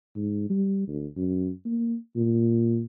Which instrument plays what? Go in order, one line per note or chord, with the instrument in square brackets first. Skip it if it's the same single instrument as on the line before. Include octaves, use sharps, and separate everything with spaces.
[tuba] G#2
G3
D2
F#2
A#3
A#2